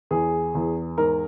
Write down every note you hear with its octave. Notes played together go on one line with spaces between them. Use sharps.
E2 G#4
E2
G#2 A#4